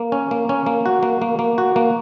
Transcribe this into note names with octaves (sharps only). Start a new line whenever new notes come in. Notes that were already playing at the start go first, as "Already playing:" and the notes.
Already playing: A#3
C#4
A#3
C#4
A#3
F#4
A#3
A#3
A#3
F#4
A#3